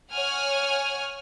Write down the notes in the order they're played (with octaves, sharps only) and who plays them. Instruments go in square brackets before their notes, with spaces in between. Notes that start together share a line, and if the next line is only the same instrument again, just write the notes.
[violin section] C#5 F#5 G#5 F6